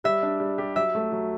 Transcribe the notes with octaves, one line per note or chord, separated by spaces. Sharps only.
G3 E5
D4
G3
G4
F#3 E5
A3
F#3